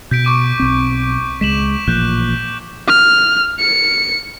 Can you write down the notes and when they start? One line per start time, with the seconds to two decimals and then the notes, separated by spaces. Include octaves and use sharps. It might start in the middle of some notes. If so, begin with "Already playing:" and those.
0.11 B2 G6 B6 D7
0.25 C#6 D6 D#7
0.59 B1 C4
1.41 C#2 G#3 B6 E7 F#7
1.88 A1 A#2 F3 F#6 G6
2.88 F6
3.59 C#7